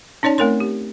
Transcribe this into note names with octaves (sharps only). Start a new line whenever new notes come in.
C#4 D#4 C#5 D5 A5
A3 C4 A#4 C#5 C6
G4